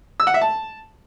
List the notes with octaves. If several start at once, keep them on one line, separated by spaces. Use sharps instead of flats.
E6
F#5
E5
A5